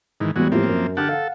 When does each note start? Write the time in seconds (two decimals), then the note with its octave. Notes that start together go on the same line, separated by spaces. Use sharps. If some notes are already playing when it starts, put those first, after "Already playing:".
0.20 G#2 D#3 E3
0.36 E1 E3 G3 G#3 F#4
0.52 A2 F3 A#3 C4 G4
0.69 F#2
0.97 D3 G4 F#5 A5 F6
1.09 A4 F5 F#5